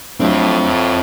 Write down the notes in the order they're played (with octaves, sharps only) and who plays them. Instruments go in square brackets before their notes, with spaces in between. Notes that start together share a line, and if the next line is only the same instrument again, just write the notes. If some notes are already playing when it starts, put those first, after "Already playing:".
[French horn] A2 [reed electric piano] F#3 A3 D4 [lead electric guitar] C4 F4
[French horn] A2